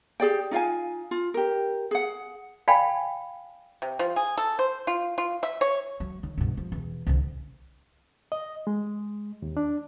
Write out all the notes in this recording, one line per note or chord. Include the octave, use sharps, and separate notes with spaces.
G4 G#4 D5 G5
D#4 F4 F5 G#5
F4
G4 A#4
G#4 F#5
D5 F5 G5 G#5 B5
C3
F3
G#4
A4
C5
F4
F4
E5
C#5
F#3
D#3
G2 B2
F3
E2 B2
C2 D3
D#5
G#3
D#2
D4